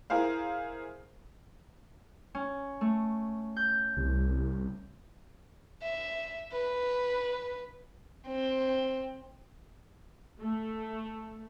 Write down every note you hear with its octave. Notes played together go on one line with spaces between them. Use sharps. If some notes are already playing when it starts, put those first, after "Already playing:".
E4 G#4 A#4 C5 F5
C#4
A3
G6
C2
E5
B4
C4
A3